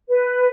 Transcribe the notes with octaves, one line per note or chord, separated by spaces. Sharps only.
B4